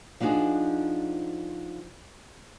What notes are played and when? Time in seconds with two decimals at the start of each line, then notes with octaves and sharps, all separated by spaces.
0.20 F3 D4 D#4 F#4 G#4